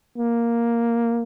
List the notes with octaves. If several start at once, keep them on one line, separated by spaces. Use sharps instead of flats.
A#3